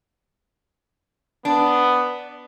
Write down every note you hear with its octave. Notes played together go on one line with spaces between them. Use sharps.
B3 D4